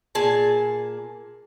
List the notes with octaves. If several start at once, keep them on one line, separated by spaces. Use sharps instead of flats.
A#2 G#4 A5